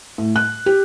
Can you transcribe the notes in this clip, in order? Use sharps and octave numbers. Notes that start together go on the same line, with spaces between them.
A2
F#6
G4